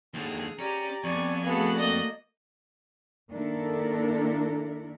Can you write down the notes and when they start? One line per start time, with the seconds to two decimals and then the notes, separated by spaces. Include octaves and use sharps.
0.14 D#2 D3 G#4 F6
0.59 C#4 G4 D5 A#5
1.04 F2 B3 D5 G#5 C#6
1.46 A3 B3 F#4 G#4 A4 F5 F#6
1.77 A#3 D5 D#5
3.30 D#3 A#3 D4 E4 A4 A#4